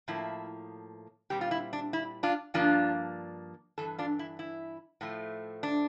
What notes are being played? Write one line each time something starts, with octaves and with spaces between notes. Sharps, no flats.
A2 F3 A#3 E4
A#2 G3 C4 G4
F4
E4
D4
E4
D4 F4
G2 F3 A#3 D4 F4
G2 E3 A4
D4 F4
E4
E4
A2 F3 A3
D4